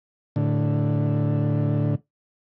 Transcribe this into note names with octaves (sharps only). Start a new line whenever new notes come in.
A2 D3